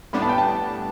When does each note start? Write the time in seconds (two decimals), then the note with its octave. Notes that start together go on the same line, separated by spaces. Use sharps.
0.13 A2 G3 B3 D4 B5
0.22 A5
0.29 G5
0.38 A5